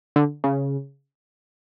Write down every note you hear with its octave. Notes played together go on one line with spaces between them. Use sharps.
D3
C#3